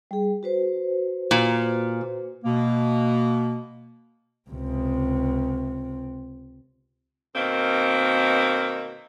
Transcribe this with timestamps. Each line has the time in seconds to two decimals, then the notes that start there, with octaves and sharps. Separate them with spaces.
0.11 G3 G#4
0.43 F#4 B4 C5
1.31 A#2
2.45 B2 A#3
4.50 C#2 C3
7.35 B2 D#3 A#3 C4